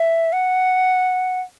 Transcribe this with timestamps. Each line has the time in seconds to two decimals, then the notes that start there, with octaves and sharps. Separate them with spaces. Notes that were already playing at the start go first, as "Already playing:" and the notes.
Already playing: E5
0.33 F#5